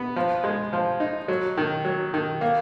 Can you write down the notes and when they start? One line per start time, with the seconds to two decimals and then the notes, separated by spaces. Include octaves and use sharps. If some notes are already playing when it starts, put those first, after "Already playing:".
Already playing: B3
0.16 F3
0.44 G#3
0.73 F3
1.00 D#4
1.28 F#3
1.58 D#3
1.85 F#3
2.14 D#3
2.41 A#3